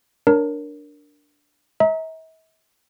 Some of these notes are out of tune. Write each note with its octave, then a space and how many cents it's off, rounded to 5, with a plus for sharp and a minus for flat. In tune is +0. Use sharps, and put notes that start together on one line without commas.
D4 +0 A#4 +0 C#5 +0
E5 -45 A#5 +0